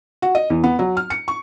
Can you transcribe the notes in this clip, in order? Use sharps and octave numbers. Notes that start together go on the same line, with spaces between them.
F#4
D#5
E2
B3
F#3
F6
C#7
C#6